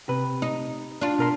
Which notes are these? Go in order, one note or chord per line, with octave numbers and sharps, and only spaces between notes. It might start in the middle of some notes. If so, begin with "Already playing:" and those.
C3 B4
D#4
D4 F4
B2 A#4 C6